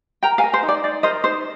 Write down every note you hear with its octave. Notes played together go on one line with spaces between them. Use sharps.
A#4 G5 A#5
F5 G#5
A#4
C5
D#4
D5
D#4 D5
A#4 C5 D#5
D#4 C5